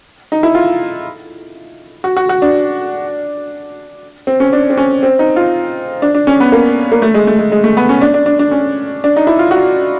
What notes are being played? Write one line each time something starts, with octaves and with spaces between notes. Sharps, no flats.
D#4
E4
F4
F#4
F#4
F#4
D4
C4
C#4
D4
C4
C#4
C4
D#4
F4
D4
D4
C#4
B3
A#3
A#3
A3
G#3
A3
G#3
G#3
A3
B3
C#4
D4
D4
D4
D4
C#4
D4
D#4
E4
F4
F#4